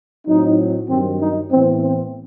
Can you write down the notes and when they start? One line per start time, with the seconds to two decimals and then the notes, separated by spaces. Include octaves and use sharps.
0.27 A2 F#3 C4 D#4
0.89 G2 D#3 F#3 C4
1.21 D#4
1.51 A2 E3 B3 C4
1.83 C4